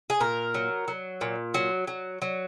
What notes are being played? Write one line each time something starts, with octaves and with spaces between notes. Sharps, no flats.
G#4
A#2 A#4
F#3
F#3
A#2
F#3
F#3
F#3